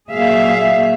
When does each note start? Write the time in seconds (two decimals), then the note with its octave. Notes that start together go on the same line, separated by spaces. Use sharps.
0.11 A#2 F#3 A#3 G#4 E5 F5